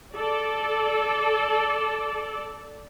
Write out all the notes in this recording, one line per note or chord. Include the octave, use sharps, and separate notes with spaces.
A4 D5